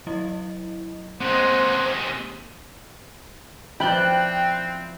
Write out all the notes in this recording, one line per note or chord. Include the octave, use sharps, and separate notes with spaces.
F#3 E4 D#5
C3 G#3 A#3 C4 C5 F#5
F3 C4 E4 D5 G5 B5 F#6 G6